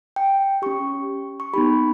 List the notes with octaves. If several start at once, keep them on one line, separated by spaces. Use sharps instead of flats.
G5
C#4 G4 C#6
C#6
B3 D#4 G4 B5